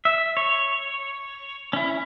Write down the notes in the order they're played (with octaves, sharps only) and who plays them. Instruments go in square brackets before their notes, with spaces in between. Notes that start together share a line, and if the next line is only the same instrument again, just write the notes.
[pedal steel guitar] E5
C#5
C#4 E4